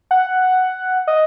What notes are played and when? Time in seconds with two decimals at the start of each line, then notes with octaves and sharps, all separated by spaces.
0.11 F#5
1.07 D#5